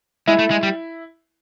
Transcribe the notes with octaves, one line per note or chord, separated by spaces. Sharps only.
G#3 E4
A3
G#3
G3